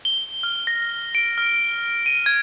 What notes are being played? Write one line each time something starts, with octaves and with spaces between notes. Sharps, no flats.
G7
F6
A#6
D7
F6
D#7
G#6